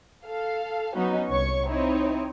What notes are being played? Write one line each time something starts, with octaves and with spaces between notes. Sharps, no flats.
A4 F5
F#3 B3 C#4 D#4 F#4
C2 C#5 C#6
C4 D#4 E4 C#5